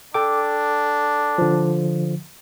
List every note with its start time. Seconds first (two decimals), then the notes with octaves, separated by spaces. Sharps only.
0.14 D4 A4 G5 D6
1.38 D3 F3